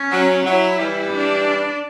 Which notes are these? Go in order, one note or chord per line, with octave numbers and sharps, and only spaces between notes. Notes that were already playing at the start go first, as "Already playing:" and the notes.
Already playing: C#4
F#3
F#3 E4
E3 G3
D4